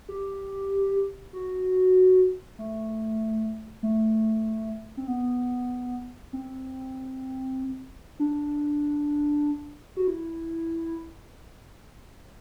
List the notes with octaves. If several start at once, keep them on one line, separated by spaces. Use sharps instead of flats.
G4
F#4
A3
A3
C4
B3
C4
D4
F#4
E4